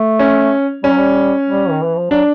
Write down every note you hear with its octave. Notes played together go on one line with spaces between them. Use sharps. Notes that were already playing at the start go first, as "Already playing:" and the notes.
Already playing: A3
C#4
G3 C#4
F#3
G3
G3
D#3
E3
F3
F#3 D4